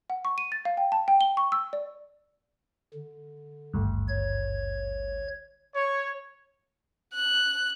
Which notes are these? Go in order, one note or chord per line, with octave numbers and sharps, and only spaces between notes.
F#5
C#6
D#7
A6
F5
G5
A5
G5
G7
C#6
E6
D5
D3
G#1 D2 G2
C#5 G#6
C#5
F#6